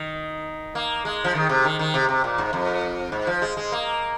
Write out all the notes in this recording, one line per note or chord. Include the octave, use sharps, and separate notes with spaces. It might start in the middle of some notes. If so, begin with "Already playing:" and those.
Already playing: D#3
A#3
G#3
F3
D#3
C3
D#3
D#3
C3
C3
A#2
G#2
F2
G#2
F3
G#3
G#3
A#3